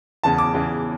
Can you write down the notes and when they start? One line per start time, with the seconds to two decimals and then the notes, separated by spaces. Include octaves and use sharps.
0.23 E2 C#3 E3 A5
0.38 D6
0.54 E2 C#3 E3